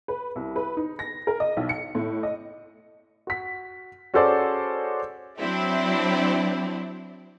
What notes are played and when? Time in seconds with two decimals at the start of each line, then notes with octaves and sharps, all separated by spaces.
0.08 B4
0.36 C2
0.56 B4
0.77 D#4
0.99 A#6
1.27 A#4
1.40 D#5
1.57 B1
1.69 C#7
1.95 A2
2.23 D#5
3.27 F#4 B6
4.14 C#4 F#4 G#4 A4 C5 D5
5.39 F#3 C4 D4 E4